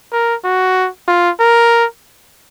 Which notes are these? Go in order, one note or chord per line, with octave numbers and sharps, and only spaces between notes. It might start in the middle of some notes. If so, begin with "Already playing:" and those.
A#4
F#4
F4
A#4